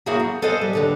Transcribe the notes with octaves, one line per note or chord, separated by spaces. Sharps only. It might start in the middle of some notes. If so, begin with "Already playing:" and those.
A3 A#3 E4 F#4 G#4
A3
A4 B4 C5 D#5 F5 G#5
G3
D#2 D3 B4